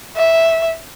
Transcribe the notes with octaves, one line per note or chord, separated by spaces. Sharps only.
E5